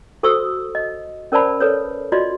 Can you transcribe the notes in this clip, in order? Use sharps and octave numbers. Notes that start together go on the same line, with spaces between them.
F#4 A4 C5 C#6 D#6 E6
D#5
C#4 A#4 C5 D5 A5 B5
A4 B4 C#5
F4 F#4 D5 D#5 C6